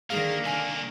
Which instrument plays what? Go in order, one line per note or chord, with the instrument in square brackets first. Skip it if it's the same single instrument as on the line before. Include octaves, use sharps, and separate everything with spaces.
[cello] D3 D#3 [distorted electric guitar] A#3 [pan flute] G#4 [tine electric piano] F5
[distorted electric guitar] C2 A#3 [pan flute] G#5